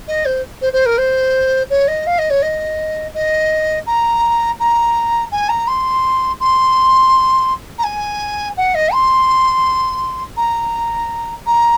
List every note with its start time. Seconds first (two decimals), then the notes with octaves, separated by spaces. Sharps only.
0.08 D#5
0.26 C5
0.62 C5
0.73 C5
0.86 A#4
0.98 C5
1.70 C#5
1.88 D#5
2.07 F5
2.19 D#5
2.30 C#5
2.42 D#5
3.14 D#5
3.87 A#5
4.60 A#5
5.32 G#5
5.49 A#5
5.68 C6
6.40 C6
7.79 A#5
7.84 G#5
8.57 F#5
8.75 D#5
8.93 C6
10.37 A#5
11.47 A#5